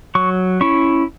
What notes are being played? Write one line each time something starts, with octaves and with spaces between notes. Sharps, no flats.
F#3 C#6
C#4 E4 C#6